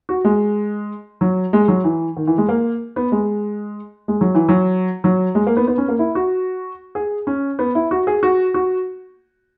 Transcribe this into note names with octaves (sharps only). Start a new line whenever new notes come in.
F#4
G#3
F#3
G#3
F#3
E3
D#3
E3
G#3
A#3
B3
G#3
G#3
F#3
E3
F#3
F#3
G#3
A#3
B3
B3
C#4
A#3
E4
F#4
G#4
C#4
B3
E4
F#4
G#4
F#4
F#4